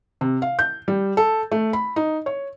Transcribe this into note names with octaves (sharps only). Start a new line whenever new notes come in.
C3
F5
G6
G3
A4
A3
B5
D#4
C#5